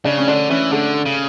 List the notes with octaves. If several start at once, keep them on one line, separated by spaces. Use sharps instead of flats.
C#3 D4
C#4
D3 D4
E3 C#4
D3 A3
C#3